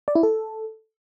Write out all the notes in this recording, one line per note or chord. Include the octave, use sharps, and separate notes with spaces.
D5
E4
A4